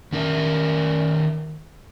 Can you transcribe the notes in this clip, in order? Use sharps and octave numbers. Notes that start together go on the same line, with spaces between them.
D#3 C#4 A#4